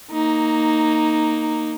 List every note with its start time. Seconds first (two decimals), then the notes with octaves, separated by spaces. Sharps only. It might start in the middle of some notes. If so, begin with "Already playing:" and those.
0.12 A#3 D#4